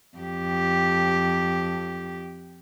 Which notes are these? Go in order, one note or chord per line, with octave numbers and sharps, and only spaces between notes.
F2 G4